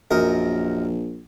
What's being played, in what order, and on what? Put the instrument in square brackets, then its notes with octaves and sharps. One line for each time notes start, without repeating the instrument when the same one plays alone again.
[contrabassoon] A#1 [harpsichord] F#2 A#4 D#5